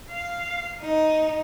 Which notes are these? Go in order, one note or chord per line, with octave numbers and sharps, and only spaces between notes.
F5
D#4